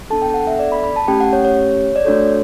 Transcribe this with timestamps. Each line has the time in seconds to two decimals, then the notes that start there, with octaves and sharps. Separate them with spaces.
0.10 B3 D4 A4 A5
0.22 G5
0.34 F#5
0.47 E5
0.59 D5
0.72 B5
0.84 B5
0.96 A5
1.08 A3 C#4 G4 G5
1.20 F#5
1.33 C#5
1.45 C#5
1.96 D5
2.05 A3 D4 F#4 A4 C#5